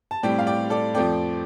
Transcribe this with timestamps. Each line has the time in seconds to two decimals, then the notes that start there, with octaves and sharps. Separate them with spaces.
0.11 A5
0.23 A2 G3 C4 D5 G5
0.39 F5
0.47 D5 G5
0.70 A4 D5
0.94 F2 F3 A3 C4 D5 G5